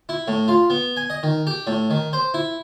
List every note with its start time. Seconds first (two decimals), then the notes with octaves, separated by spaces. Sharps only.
0.09 E4
0.28 A2
0.48 F4
0.70 B3
0.97 G#5
1.10 D#5
1.23 D#3
1.47 G4
1.67 A2
1.90 D#3
2.13 C5
2.34 E4